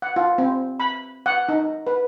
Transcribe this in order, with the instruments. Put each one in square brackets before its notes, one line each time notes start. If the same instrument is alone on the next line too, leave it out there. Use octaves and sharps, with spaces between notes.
[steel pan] F#5
F4
C4
B5
F#5
D#4
B4